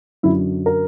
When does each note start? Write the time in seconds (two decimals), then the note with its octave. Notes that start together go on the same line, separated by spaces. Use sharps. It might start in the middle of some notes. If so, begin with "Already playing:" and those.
0.23 F#2 D3 F#3 E4
0.66 A#4